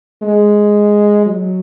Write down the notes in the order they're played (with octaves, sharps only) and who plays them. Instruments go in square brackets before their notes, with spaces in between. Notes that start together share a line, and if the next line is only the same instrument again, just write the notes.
[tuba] G#3
F#3